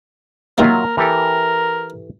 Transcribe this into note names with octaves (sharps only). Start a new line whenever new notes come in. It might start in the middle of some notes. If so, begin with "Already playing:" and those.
D#3 F#3 G3 A#3 F4 A#4 E5
E3 G4 A4 A#4